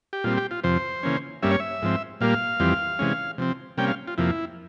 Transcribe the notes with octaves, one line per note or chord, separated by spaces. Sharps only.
G4
A#2 G3 C4 F4
G4
F4
F2 C3 F3 C5
C#3 E3 A#3 C#4
G2 G3 A#3 C#4 E5
C#5
E5
G#2 F3 C4
A#2 G3 A#3 F5
F2 E3 G3 C4
C3 E3 G#3 C#4
C3 F3 C4
C3 G3 A#3 C#4 G5
F5
F4
F2 C3 F3 A#3 E4